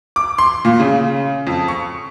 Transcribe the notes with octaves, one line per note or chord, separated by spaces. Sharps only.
D6
C6
A#2
C#3
F2
C#6